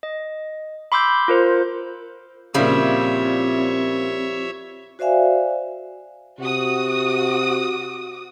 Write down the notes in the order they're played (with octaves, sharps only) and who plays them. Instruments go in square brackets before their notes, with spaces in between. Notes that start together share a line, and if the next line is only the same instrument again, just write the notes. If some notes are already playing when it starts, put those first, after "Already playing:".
[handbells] D#5
B5 C6 D6 E6 G6
F4 A#4 C5
[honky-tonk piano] A#2 C#3 [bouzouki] F3 G3 E4 [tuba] C4 [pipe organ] C#5 E5
[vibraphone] F#4 C5 D5 E5 F5 G#5
[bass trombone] C3 [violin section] F#4 D#6